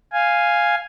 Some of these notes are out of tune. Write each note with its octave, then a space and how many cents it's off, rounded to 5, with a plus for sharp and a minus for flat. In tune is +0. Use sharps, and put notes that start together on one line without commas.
F5 +0 G#5 -5